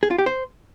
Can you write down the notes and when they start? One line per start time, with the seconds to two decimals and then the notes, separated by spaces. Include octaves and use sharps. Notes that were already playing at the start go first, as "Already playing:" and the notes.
0.03 G#4
0.11 F4
0.18 G4
0.26 C5